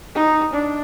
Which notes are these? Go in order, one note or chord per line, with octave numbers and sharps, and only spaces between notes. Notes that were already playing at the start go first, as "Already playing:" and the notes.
D#4
D4